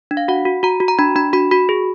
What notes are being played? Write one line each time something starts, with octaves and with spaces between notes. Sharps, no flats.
D4
F5
F#4 F#5
F#4
F#4 A#5
F#4
A#5
D4 B5
D4 B5
F#4 B5
F#4 B5
G#4